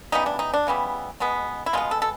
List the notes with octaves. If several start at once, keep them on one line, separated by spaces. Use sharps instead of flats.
C#3 E3 G3 B3 D#4
D4
D#4
D4
C#3 E3 G3 B3
B2 G#3 B3
E4
B2 G#3 B3 F4
A4
A4